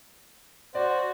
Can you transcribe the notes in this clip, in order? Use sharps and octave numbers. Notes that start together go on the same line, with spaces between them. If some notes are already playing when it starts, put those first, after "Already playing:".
F#4 C5 D5